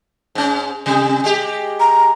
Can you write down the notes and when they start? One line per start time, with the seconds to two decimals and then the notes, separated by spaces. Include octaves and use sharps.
0.35 G#2 C#4
0.86 C3 G3
1.24 G#3 G4
1.80 A#5